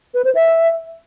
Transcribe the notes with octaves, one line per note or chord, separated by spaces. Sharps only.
B4
C5
E5